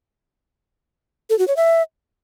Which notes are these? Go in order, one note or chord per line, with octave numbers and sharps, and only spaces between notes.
A4
F#4
C#5
E5